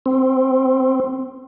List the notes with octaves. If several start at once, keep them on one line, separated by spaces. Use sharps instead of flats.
C4